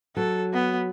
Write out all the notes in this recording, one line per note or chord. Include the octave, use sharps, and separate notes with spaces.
F#3 A4
B3